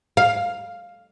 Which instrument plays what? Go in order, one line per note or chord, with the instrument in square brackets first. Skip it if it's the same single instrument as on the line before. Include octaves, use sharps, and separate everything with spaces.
[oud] F5